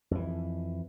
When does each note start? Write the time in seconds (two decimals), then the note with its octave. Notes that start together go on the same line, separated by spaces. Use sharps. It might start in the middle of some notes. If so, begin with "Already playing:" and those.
0.11 F2 E3